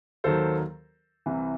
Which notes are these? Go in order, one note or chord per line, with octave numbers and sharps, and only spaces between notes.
D#2 D#3 F#3 A4 C5
C2 C3 E3